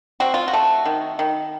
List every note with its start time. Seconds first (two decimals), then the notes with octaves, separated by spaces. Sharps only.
0.20 C4 F#4
0.34 F4
0.48 F#4
0.53 A3
0.85 D#3
1.19 D#3